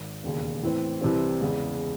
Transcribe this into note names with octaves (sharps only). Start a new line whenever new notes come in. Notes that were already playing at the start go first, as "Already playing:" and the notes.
Already playing: G#1
E1 D#2 C#3
A2 E3 C4
C2 C3 E3 C4
E2 C#3 G#3